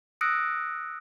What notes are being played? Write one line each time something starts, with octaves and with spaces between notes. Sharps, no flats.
D#6 E6 F#6 A#6 C#7 D7